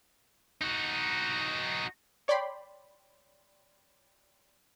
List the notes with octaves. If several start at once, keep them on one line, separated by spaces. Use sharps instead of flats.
D#4 F#4
C#5 D5 G5 B5 C6